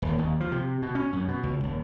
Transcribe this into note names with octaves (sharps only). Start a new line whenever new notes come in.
D#1
D#2
F3
C3
B2
C#4
F#2
B2
C#2
D#1